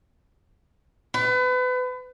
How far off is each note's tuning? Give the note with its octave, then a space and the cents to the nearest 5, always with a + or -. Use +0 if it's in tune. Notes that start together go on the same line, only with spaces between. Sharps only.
B4 +30